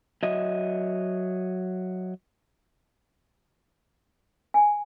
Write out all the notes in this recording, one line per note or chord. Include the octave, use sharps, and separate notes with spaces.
F#3 D#5 E5
G#5